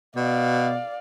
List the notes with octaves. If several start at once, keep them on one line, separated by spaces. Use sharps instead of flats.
B2 D5 F5